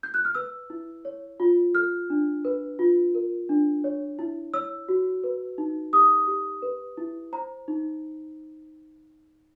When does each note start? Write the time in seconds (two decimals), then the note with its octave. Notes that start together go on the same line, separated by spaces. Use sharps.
0.03 G6
0.14 F#6
0.25 F6
0.35 B4 E6
0.70 E4
1.05 C#5
1.40 F4
1.75 A4 F6
2.10 D4
2.45 B4
2.79 F4
3.14 A#4
3.49 D4
3.84 C#5
4.19 E4
4.54 C#5 E6
4.89 F#4
5.24 B4
5.58 D#4
5.93 G4 D#6
6.28 G4
6.62 B4
6.97 E4
7.32 C5 A#5
7.68 D#4